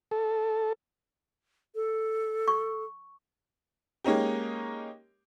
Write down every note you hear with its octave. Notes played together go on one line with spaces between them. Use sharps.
A4
A4
C#6
G#3 A#3 C#4 D#4 G4